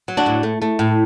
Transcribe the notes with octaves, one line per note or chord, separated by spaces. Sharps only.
F#3
D4 F#4
A2
A3
A3
A2